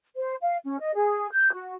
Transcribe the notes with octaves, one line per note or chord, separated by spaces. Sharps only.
C5
F5
C#4
D#5
G#4
G6
F#4